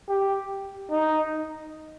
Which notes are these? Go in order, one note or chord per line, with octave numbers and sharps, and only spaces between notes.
G4
D#4